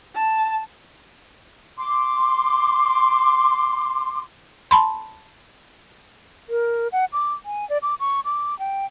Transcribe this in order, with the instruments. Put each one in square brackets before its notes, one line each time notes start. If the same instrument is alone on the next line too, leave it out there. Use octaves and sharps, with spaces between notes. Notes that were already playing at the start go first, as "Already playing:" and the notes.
[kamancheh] A5
[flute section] C6 D6
[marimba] A5 B5 C6
[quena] A#4
F#5
D6
G#5
D5
D6
C#6
D6
G5